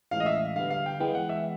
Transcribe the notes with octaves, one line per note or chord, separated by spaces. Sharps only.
A2 E3 G#3 C#4 F5
D#5
E5
D3 G3 B3 F5
F5
G5
E3 G#3 B3 G5
F#5
E5